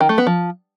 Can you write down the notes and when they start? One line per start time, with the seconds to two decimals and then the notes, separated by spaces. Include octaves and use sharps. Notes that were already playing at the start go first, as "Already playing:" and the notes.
0.01 D#3
0.09 A3
0.18 B3
0.27 F3